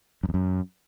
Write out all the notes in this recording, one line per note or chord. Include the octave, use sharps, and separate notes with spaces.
F#2
E2
F#2